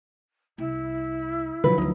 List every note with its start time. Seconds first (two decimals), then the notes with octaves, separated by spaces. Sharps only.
0.58 C2 E4
1.64 B2 D3 F3 F#3 B4
1.78 D2 D#3 D#4